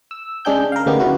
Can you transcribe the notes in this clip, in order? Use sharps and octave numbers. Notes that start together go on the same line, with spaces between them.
E6
C#3 G#3 D4 G#4 G5 G6
A#4 F5
D2 C#3 A#3 B3 D#4 G4
F#3 E4 F#4